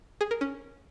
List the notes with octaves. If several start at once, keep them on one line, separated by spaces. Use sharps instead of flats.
G#4
A#4
C#4